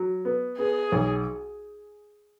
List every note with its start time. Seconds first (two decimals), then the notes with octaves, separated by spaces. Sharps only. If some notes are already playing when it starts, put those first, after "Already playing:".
Already playing: F#3
0.25 B3
0.58 B3 G#4
0.92 B1